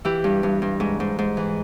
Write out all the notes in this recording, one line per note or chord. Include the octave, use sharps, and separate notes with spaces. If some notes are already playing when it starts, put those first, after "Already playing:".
E3 E4 G4
G2
G2
G2
G#2
G#2
G#2
E3